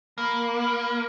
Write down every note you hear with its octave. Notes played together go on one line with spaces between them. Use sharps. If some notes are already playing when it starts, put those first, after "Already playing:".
A#3 B5